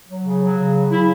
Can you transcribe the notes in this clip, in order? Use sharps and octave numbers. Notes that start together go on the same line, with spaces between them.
F#3
C#3
F#3
C#3
F#3
C#3 E4